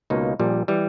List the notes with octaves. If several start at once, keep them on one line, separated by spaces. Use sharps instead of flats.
C#2 B2 A#3 D#4
A#1 A#2 G3
E3 G3